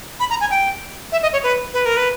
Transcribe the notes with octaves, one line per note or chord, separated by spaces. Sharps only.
B5
A#5
G#5
G5
E5
D#5
C#5
B4
B4
A#4
B4